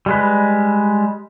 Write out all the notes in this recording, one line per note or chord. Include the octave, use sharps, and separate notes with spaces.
G3 G#3 B4